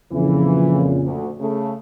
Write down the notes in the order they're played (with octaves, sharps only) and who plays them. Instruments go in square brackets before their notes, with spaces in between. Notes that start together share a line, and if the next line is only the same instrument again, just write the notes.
[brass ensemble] F2 A#2 C#3 [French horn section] E3
[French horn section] D2
C#3 A3